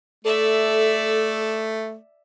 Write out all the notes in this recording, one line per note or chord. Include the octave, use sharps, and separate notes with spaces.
A3 A4 D5 E5